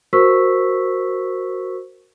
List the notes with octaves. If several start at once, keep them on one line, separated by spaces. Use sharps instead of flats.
F#4 A#4 C5 C#6 E6 B6